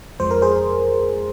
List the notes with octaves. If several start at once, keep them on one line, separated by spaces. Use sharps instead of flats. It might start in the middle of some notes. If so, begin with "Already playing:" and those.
F2 F3 G#3 C5
A#4
G#4 C5